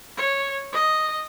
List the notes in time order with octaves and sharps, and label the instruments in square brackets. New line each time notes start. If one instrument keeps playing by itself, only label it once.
[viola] C#5
D#5